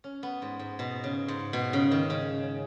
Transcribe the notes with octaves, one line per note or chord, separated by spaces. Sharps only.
C#4
B3
G#2
G#2
B2
C#3
G#2
B2
C#3
D#3
C#3